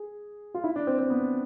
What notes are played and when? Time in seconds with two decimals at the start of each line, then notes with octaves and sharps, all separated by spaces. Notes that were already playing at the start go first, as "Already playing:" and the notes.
Already playing: G#4
0.54 F4
0.64 E4
0.76 D4
0.87 C4
0.99 C4
1.10 B3